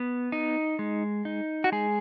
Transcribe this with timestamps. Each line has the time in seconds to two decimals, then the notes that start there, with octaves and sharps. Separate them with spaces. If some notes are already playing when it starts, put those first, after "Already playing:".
Already playing: B3
0.32 D#4
0.79 G#3
1.25 D#4
1.64 F#4
1.72 G#3 G#4